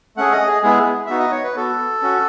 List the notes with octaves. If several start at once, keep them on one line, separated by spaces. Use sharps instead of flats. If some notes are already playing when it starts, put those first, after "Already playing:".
A3 C#4 G#4 F#5
D#5
G#4
G#3 B3 E4 G#4
B3 D#4 F#4 E5
D#5
C#5
B4
B3 F#4 A4
C#4 F#4